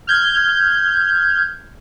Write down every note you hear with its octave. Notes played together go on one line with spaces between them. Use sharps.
F6 G6 G#6